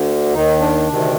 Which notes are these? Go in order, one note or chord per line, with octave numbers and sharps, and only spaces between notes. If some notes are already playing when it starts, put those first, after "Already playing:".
Already playing: D2 D3
D#2 D#3 D#4
D4
D2 C3 D#3